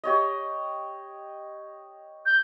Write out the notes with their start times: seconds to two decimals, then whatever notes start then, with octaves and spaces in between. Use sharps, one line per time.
0.04 G4 C#5 D#5
2.26 G6